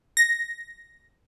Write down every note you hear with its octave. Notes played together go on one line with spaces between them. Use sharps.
A#6